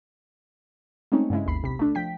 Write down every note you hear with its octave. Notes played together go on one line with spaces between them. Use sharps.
G#3 A3 C4 C#4 D#4
G2 C#3 G#3 E4
G#1 D#2 B5 C7
B1 C3 B6
A3 D4
F3 G5 B6